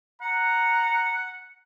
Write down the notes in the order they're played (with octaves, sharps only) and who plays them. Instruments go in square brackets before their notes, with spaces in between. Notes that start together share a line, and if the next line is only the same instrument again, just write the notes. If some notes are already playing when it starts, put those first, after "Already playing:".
[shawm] F#5 [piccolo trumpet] A#5